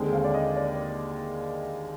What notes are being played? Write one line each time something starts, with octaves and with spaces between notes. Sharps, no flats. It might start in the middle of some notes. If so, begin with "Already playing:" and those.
Already playing: D#2 D3 G#3 C4
F5
D5
D#5
D5